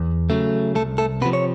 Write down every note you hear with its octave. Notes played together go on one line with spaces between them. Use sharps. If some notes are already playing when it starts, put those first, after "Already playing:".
Already playing: E2
C#3 F#3 A3
C2 A3 A4
A3 A4
C3 F3 B3 B4
C#5